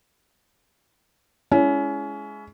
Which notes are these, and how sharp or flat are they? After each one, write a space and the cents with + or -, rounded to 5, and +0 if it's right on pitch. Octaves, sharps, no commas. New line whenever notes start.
G#3 +10 C#4 +25 E4 +15